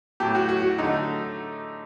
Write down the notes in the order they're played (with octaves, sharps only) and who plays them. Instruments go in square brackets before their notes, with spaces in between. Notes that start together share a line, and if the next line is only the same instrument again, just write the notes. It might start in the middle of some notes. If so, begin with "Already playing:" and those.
[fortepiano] A2 F#3 A3 G4
F#4
F#4
F#4
D3 F#3 A3 D#4